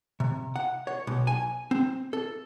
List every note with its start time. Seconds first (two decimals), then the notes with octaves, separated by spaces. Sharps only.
0.20 C3
0.56 F#5
0.87 C#5
1.07 B1
1.27 G#5
1.71 C4
2.13 A4